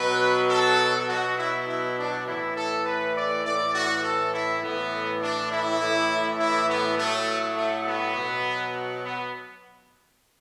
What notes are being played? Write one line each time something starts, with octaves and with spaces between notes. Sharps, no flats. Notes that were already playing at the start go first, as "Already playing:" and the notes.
Already playing: B2 F#3 B4
A4
B2 F#3 F#4
E4
E4
D4
A2 E3 E4
A4
B4
D5
A2 E3 D5
F#4
A4
E4
A2 E3 B3
D4
E4
A2 E3
E4
B3
A2 F#3 A3
A3
B3
B2 F#3
B3